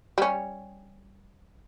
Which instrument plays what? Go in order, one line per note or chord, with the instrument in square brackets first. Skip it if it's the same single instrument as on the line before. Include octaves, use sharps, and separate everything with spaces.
[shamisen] G3 C#4